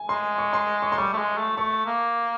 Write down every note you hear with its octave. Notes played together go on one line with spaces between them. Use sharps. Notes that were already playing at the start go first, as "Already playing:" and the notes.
Already playing: G#5
G#3 C6
C#6
C6
C#6
C6
G3 C#6
A3
G#3
A3
A3 C#6
A#3